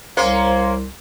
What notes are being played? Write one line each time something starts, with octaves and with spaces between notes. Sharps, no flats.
C2 A#3 C#4 C5 F5 C6